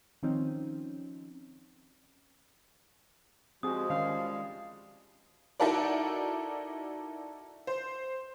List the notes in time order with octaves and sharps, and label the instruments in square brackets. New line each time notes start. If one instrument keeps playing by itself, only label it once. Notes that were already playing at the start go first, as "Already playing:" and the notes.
[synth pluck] D#3 F3 C4 C#4 D#4
[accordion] F3 G3 G#3 [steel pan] C4 G#4 [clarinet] F#4 [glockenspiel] D#6
[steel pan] D#3 C#4 D#4 [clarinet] F5
[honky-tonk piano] D#4 E4 F#4 A4 A#4 D5
C5